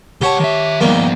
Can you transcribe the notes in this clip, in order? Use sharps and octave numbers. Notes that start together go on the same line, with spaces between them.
C#2 G4 C#5 F#5 A5
D#3 E5
D#3 F3 G3 A#3 B3